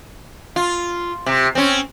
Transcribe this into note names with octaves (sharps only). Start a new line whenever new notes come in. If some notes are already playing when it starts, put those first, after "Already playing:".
F4
C3
C4 C#4